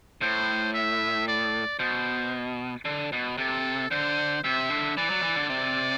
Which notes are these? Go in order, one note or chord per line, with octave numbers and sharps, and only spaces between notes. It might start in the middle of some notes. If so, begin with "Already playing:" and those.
A2 C5
E5
D5
B2 C5
D3
B2
C3 A4
D3 C5
C3 E5
D3
E3 D5
F#3
E3
D3
C3 D5